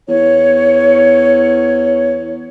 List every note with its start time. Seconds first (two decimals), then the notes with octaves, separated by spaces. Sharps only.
0.08 E2 C#5